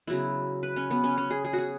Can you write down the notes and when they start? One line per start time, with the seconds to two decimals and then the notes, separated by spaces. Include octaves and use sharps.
0.07 C#3 F#3 B3 E4
0.63 B4
0.76 C#4
0.91 B3
1.04 C#4
1.18 C#4
1.31 G#4
1.45 G#4
1.53 F#4
1.58 G#4